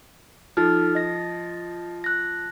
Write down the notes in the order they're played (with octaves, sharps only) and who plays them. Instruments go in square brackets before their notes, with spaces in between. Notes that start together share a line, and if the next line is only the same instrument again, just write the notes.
[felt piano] F3 [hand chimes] D#4 A4 F6
[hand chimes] D#5 A#6
F#6 A#6